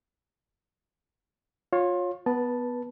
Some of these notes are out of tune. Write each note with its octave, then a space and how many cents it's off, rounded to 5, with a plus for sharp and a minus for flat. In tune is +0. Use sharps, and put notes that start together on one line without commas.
F4 +25 C#5 -10 C6 +25
B3 +5 B4 -25 A5 +0